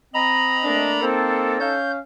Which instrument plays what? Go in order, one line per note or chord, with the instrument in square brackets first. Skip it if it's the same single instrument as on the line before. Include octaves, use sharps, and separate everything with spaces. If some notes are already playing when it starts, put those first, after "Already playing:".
[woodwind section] C4 D#5 [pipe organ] A#5 B5
[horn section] A3 A#3 D4
[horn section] A#3 C4 [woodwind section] D#4 A4
[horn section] C#4 F5 [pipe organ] G6